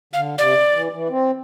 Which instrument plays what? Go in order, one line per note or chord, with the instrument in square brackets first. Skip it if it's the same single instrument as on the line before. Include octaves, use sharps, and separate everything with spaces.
[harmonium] D3 [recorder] F5
[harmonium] C3 [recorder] D5
[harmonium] E3
E3
C4